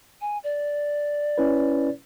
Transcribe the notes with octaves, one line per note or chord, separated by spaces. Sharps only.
G#5
D5
C#4 E4 B4